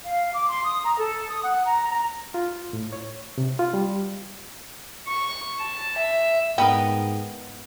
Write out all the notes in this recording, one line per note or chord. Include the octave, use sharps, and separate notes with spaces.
F5
D6
C6
D#6
A#5
A4
D#6
F#5
A#5
A#5
F4
A2
C#5
C3
F4
G3
C#6
A5
E5
G#2 B3 A#4 B4 D#5 G5